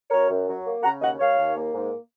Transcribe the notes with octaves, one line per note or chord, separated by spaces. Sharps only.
F#2 A#4 C#5
F#2
F#3
A#3
C#3 F#5 A#5
D#2 D#5 F#5
D#2 C#5 F5
D#2
A#3
G#2